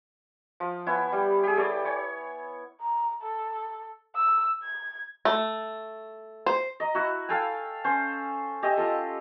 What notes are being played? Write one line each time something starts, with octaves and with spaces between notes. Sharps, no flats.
F3
B3 E4 C#5 G#5
G3 G4
G4 G#4
G4 A4 C#5 D5
C#5 G#5
A#5
A4
E6
G#6
A3
C5
D#5 A#5
E4 F#4
A4 F5 G5 G#5
C#4 C5
G4 D#5 E5 G#5
F4 A4